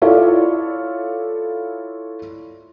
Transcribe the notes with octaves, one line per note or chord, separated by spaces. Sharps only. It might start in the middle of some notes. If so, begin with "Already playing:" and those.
E4 F4 A4 C#5 D5 F5